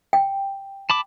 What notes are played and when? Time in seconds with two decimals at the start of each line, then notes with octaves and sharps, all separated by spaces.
0.13 G5
0.90 A5 B5 D6